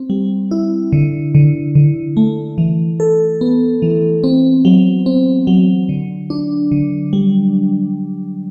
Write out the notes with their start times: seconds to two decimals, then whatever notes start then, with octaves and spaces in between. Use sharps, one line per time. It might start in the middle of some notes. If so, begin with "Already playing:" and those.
Already playing: C4
0.10 G3
0.51 E4
0.93 D3
1.35 D3
1.75 D3
2.17 A3
2.58 E3
3.00 A4
3.41 B3
3.82 E3
4.24 C4
4.65 F#3
5.06 C4
5.47 F#3
5.89 D3
6.30 D4
6.72 D3
7.13 G3